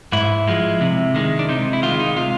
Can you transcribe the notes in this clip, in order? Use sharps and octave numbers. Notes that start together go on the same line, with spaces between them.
G#2 E4
F3 G#3
C3
D#3 G#3
D4
C3 D#4
E4
D#3 G#3 F4
D#4
C3 F4